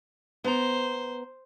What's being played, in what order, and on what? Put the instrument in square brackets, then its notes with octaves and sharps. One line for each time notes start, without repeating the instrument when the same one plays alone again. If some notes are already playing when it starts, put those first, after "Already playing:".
[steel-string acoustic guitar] B3 A#5 [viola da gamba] C5